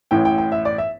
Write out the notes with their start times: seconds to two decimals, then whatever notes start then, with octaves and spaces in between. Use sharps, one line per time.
0.11 A1 A2 E3 G5
0.25 G5
0.38 G5
0.52 E5
0.65 D5
0.78 E5